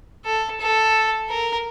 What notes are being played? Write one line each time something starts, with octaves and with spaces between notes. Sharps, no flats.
A4
A4
A#4